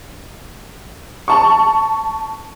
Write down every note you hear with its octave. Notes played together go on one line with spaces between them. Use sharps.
A5 C#6